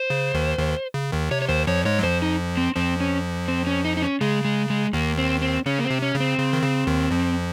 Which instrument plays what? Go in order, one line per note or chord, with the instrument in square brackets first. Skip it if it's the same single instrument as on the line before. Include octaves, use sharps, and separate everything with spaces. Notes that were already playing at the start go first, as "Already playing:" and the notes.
Already playing: [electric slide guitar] C5
[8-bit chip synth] C#3
D#2 D#3
D#2 D#3
C#3
D#2 D#3
[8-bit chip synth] C3 [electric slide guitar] C#5
[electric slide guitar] C#5
[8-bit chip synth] D#2 D#3 [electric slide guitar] C5
[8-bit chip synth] F2 F3 [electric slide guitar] C#5
[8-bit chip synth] G#2 G#3 [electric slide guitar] C#5
[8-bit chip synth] F#3
[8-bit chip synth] F2 F3 [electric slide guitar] C5
[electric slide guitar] D#4
C4
[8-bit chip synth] F2 F3 [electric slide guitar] C4
[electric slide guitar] C#4
C4
C#4
D#4
D#4
C#4
[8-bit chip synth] C#3 [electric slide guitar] G#3
[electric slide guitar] G#3
G#3
[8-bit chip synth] D#2 D#3 [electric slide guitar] A#3
[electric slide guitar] C4
C4
[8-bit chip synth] C#3 [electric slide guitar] C#4
[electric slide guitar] A#3
C4
[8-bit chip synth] C3
[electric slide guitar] C#4
[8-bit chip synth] C#3
[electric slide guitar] C4
[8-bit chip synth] C#3
D#3
C#3
D#2 D#3
F2 F3